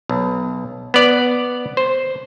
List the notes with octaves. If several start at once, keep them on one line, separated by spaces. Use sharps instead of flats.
B1
B3 D5
C5